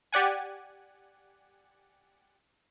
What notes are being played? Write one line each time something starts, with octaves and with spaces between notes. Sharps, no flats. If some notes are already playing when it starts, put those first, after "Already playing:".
G4 D5 F#5 G#5